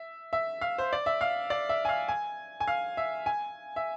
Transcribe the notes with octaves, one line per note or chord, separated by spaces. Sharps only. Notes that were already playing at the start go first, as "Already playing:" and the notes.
Already playing: E5
E5
F5
C5
D5
E5
F5
D5
E5
G#5
F5
G#5
G#5
F5
E5
G#5
E5